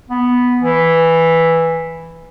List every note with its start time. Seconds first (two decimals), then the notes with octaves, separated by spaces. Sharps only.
0.09 B3
0.62 E3